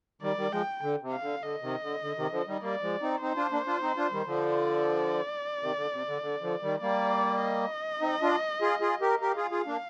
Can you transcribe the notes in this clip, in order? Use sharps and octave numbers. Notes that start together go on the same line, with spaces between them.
D#3 G3 D5
D#3 G3
F3 G#3 G5
D3
C3
F5
D3
D3 D#5
C3 D#3
D3
D3
C3 D#3
D3 F3
D#3 G3
G3 A#3 D5
F3 G#3
C4 D#4
C4 D#4 C5
D4 F4
A#3 D4
D4 F4
C4 D#4
D4 F4
D#3 G3
D3 F3
D5
C3 D#3
D3
C3
D3
D3
D3 F3
D#3 G3
G3 A#3 D5
D#5
C4 D#4
D4 F4
F4 G#4
F4 G#4
G4 A#4
G4 A#4 F5
F4 G#4
F4 G#4
A#3 D4